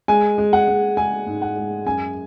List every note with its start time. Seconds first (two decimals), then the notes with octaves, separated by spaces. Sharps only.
0.08 G#3 G#5
0.38 G#3
0.53 F#5
0.68 G#3
0.97 G#3 G#5
1.27 G#2
1.42 F#5
1.56 G#3
1.86 F#2 G#5